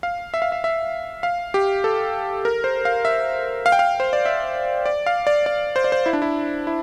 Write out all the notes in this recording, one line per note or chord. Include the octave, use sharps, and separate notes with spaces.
F5
E5
F5
E5
E5
F5
G4
A4
A#4
C5
F5
E5
F5
G5
F5
C5
D5
E5
D5
F5
D5
D5
C5
D5
C5
E4
D4
E4
E4